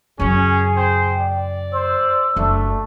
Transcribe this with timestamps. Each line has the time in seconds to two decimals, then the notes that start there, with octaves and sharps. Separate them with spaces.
0.19 F#2 C#3 C#4 G#4
0.77 C5 G5
1.20 D5
1.73 C5 E6
2.36 F#1 A3 D4